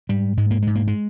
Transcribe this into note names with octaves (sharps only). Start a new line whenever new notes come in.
G#2 G3
G#2 G#3
A#3
G#2 G#3
A#3
G#3